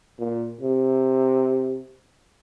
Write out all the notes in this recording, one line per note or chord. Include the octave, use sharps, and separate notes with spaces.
A#2
C3